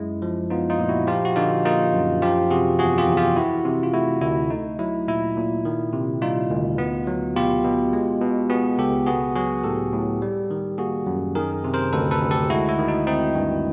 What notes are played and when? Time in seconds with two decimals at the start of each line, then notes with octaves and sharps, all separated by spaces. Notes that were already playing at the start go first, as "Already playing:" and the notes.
Already playing: F#2 G#3 E4
0.22 F3
0.50 B3 D#4 F4
0.70 D#4 F4
0.79 A#2
0.89 E4 F#4
1.07 F3 F4 G4
1.25 F#4
1.36 D3 D#4 F4
1.65 A#3 D#4 F4
1.94 F#2
2.22 F3 F4 G4
2.50 C3 F#4 G#4
2.79 E2 F#4 G#4
2.98 F4 G4
3.08 E2
3.17 F4 G4
3.36 E3 E4 F#4
3.65 C3
3.83 F4
3.93 A3 E4 F#4
4.21 D2 E4
4.50 A3 D#4
4.79 F#3 E4
5.08 A#2 E4
5.37 A#2
5.65 D#3
5.93 C3
6.22 G3 D#4 F4
6.50 D2
6.78 B3
7.07 F#3
7.36 B2 F4 G4
7.64 B2
7.93 G#3
8.21 B2
8.49 B3 F#4 G#4
8.78 C#2 G4 A4
9.07 B3 F#4 G#4
9.36 F#3 F#4 G#4
9.64 A2 G4 A4
9.93 A2
10.22 G3
10.51 D#3
10.78 A#3 F#4 G#4
11.06 F#2
11.35 D#3 G#4 A#4
11.64 C3
11.74 A#4 C5
11.93 D2 A4 B4
12.11 A4 B4
12.21 D2
12.31 G4 A4
12.50 G#3 E4 F#4
12.69 E4
12.78 D#3
12.88 D#4
13.07 C4 D#4
13.35 G2